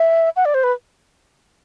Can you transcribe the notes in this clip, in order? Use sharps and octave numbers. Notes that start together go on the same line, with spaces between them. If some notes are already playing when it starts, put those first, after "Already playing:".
Already playing: E5
F#5
D5
C5
B4